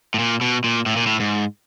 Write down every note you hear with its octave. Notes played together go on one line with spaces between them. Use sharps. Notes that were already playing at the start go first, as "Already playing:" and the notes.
A2
A#2
B2
A#2
A2
A#2
A2
G#2